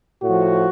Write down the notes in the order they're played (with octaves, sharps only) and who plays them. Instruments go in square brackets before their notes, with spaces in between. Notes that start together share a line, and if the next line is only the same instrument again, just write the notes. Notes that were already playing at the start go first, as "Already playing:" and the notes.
[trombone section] A2 F3 F#4